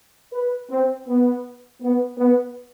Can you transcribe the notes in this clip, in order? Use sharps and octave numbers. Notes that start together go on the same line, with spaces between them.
B4
C4
B3
B3
B3